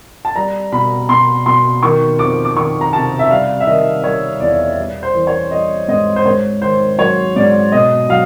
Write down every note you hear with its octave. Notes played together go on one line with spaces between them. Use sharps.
A5
G3 A#5
B2 B5
B2 C6
B2 C6
D#3 C#6
F2 D6
D6
D#3 C#6
A#5
C3 A5
E5
G3 F5
E5
D#3 D#5
G3 C#5
E2 D5
G3
C5
E3
C#5
G3 D#5
G#2 D#5
C5
G#2 C#5
D#3 C5
F#3 C#5
G#2 D5
B2 D#5
F#3 F5